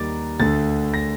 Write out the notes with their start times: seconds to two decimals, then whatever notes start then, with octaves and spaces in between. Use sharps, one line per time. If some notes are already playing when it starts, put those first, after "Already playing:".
Already playing: D#2 D#3 G3 A#5 D6 A6
0.40 D2 D3 A3 A6
0.94 A#6